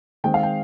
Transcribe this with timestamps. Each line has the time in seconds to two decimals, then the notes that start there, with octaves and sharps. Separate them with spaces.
0.24 D#3 G#3 C4 G5
0.34 F5
0.43 G5